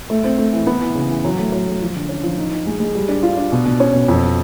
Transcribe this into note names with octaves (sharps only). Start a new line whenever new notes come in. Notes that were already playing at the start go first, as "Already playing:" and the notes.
A3
C4
A3
E3
B3
E3
C#3
E3
F#3
A3
F#3
A3
F3
D3
C#4
F3
D#4
D#4
G#3
G#3
G3
D4
F4
D4
B2
B2
C#4
B2
F2